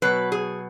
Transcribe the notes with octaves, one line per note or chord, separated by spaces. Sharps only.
B2 F#3 B4
G#4